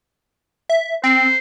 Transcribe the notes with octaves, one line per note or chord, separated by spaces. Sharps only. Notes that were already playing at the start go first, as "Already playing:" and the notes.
E5
C4 C5